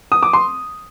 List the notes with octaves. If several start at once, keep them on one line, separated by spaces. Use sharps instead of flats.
D#6
D6
C6